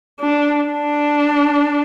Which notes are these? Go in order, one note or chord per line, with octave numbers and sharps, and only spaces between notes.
D4
D4